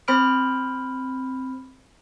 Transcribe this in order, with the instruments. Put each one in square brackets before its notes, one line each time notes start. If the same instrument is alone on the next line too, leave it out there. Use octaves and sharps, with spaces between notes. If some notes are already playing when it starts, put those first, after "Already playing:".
[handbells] C4 C5 B5 F6 D7